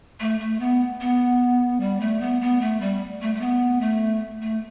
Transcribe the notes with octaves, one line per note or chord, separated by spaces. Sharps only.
A3
A3
B3
B3
G3
A3
B3
B3
A3
G3
A3
A3
B3
A3
A3